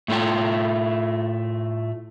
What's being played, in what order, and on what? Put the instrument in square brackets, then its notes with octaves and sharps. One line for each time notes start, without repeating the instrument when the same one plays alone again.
[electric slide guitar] A2 A3 F4 G5